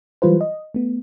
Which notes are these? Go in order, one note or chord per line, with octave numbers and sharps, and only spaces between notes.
E3 F#3 G3 F4 B4 C5
D#5
A3 B3